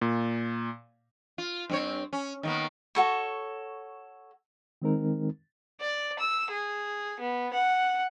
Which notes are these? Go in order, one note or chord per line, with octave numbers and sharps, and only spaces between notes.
A#2
F4
G2 C4 C#5
C#4
D#3 A#3 B3
F#4 A4 C#5
D#3 G#3 C4 D#4 A#4
D5
E6
G#4
B3
F#5